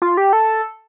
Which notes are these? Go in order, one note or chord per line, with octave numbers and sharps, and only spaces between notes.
F4
G4
A4